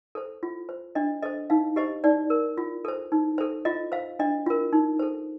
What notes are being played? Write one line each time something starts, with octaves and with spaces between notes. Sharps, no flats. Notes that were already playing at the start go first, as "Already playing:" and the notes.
A4 C5
F4
C5
D4 D#5
A4 C5 D#5
D#4 F5
G4 C5 D#5
D#4 D5
A#4
F4
A4 C5
D#4
A4 C5
F4 D#5
C5 F5
D4 D#5
F4 A#4
D#4
A4 C5